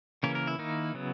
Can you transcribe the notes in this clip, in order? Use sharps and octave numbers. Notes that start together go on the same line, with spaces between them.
C#3 E3 A#3 C#4 A#4
A#4
E4
D#3 A#3 D#4
C#3 F#3 B3